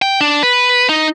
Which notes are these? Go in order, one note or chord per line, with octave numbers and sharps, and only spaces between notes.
G5
D4
B4
D#4